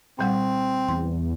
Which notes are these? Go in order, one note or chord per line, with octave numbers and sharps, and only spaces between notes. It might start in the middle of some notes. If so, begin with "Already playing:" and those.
A#2 G3 C4 F#5
E2 C6